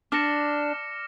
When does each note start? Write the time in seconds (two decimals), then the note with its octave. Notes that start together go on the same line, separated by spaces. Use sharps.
0.12 D4 D6 F6 A#6 C#7 E7